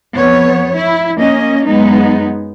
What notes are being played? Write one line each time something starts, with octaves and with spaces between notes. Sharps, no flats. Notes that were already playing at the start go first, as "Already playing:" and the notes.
F2 B3 C#5
E4
A#3 C#4 D#5
F#2 G#3 B3 D#4